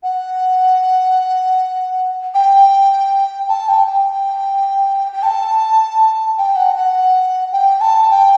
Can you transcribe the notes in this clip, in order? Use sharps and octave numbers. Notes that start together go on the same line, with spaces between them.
F#5
G5
A5
G5
G5
G5
A5
G5
F#5
F#5
G5
A5
G5